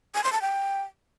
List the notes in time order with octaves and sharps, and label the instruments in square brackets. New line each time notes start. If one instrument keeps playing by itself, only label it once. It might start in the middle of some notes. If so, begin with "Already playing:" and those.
[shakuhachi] G#5
C6
A5
G5